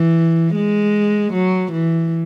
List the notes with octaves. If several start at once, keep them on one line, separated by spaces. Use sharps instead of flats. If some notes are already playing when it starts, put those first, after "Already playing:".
Already playing: E3
G#3
F#3
E3